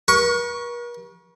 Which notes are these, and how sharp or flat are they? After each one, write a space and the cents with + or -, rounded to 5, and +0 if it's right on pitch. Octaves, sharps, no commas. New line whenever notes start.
A#4 +45 C#6 +0